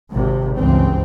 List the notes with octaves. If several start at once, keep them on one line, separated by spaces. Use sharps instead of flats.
G#1 C3
C#2 G2 E3 C4